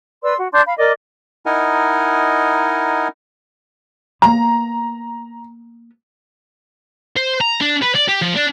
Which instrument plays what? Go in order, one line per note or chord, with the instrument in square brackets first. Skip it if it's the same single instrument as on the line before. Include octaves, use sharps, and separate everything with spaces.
[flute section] B4 D5 C6 E6
F#4
D4 C6 G6
F5 B5
A#4 D5 D#5 D6
[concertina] D#4 E4 A#4 D#5 F#5 G#5
[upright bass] A#3 B3 [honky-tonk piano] A#5
[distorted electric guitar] C5
A#5
D4
B4
D5
G4
F3
D4